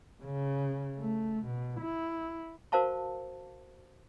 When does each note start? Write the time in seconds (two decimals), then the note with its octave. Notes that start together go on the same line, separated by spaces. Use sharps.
0.23 C#3
0.98 A3
1.46 B2
1.80 E4
2.72 F#4 A#4 C5 F5 A5 C#6